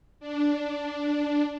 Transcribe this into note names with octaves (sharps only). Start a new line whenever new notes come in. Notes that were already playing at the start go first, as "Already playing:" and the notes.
D4